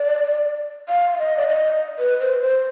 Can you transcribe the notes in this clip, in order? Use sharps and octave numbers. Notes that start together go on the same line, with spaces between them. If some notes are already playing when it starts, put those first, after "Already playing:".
Already playing: D5
F5
F5
D#5
D5
D#5
B4
C5
C5